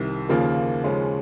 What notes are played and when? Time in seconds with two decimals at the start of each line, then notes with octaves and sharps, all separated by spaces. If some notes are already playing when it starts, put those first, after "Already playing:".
Already playing: C2 C3 D#3
0.29 D#2 C#3 F3 A#3 F4
0.83 D#2 C#3 F3 G#3 C#4